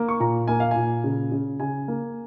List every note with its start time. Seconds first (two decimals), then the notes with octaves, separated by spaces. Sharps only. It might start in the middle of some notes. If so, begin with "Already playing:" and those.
Already playing: A#3
0.08 C#6
0.20 A#2 A#5
0.48 A#3 G#5
0.60 F5
0.71 A#2 G#5
1.04 C#3
1.32 C#3
1.60 C#3 G#5
1.88 A#3